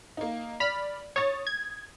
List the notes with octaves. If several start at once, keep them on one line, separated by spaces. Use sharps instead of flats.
A#3 D#4
D5 B5 F6
C#5 D#6 A6
G#6